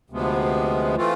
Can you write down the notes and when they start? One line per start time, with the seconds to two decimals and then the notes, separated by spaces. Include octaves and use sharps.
0.10 D2 C3 F3 G#3 B3
0.96 E3 A3 C4 F4